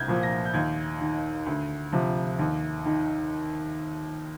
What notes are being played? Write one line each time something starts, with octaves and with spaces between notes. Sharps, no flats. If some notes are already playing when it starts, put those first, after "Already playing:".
Already playing: C2 G6 G#6
A#2 F3
A#6
G6
D#2 G#6
D#3
D2
C3 F3
D#2
D#3